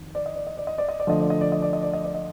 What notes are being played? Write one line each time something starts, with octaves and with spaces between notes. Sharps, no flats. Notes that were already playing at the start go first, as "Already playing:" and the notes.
Already playing: F2 D#3
D5
D#5
D5
D#5
D5
D#5
D5
D#5
D5
D3 F3 A3 D4 D#5
D5
D#5
D5
D#5
D5
D#5
D5
D#5
D5
D#5